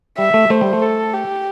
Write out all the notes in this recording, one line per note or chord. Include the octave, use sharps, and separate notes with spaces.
G3 E5
A3
A3 C5
G3
A3
A4
G4